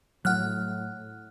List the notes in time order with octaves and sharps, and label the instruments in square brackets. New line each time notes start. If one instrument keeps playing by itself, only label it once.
[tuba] A2 [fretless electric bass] F#3 [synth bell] F#5 F6 F#6